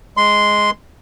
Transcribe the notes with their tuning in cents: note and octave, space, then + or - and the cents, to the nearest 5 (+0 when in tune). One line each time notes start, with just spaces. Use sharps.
G#3 +5 C6 -10